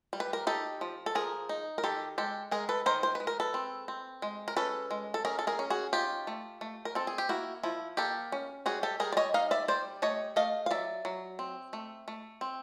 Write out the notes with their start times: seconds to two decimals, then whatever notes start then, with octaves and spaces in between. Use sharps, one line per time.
0.13 G3
0.20 B4
0.33 A#4
0.47 D#4 G4 A4
0.81 F3
1.06 A4
1.15 F3 G#4 A#4
1.49 D#4
1.78 A#4
1.84 D#3 G4 A4
2.18 G#3 G4 A4
2.51 G#3 G#4 A#4
2.69 A4 B4
2.86 D#3 A#4 C5
3.03 C5
3.15 G#3 B4
3.27 A#4
3.40 A4 B4
3.54 C4
3.88 C4
4.22 G#3
4.48 A#4
4.56 C#4 A4 B4
4.91 G#3
5.14 A4
5.25 C#4 G#4 A#4
5.39 A4
5.47 G#4 A#4
5.59 C#4
5.70 F#4 G#4
5.93 D#4 F4 G4
6.27 A3
6.61 A3
6.85 A#4
6.95 C4 A4
7.07 G#4
7.18 G4
7.29 A#3 E4 F#4
7.63 F3 E4
7.97 A#3 G4 A4
8.32 C#4
8.66 G3 F#4 G#4
8.83 G4 A4
9.00 G3 G#4 A#4
9.12 D5
9.17 C#5 D#5
9.34 D#4 D#5 F5
9.51 D5 E5
9.68 G3 C5 D5
10.02 A3 C#5 D#5
10.36 A3 D#5 F5
10.66 F5
10.71 F#3 D5 E5
11.05 F#3
11.39 C4
11.73 A3
12.08 A3
12.41 C4